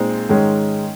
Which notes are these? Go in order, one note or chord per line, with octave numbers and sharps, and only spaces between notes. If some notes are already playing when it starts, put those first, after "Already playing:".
Already playing: A#2 G#3 C4 D#4
G#2 D#3 G#3 C#4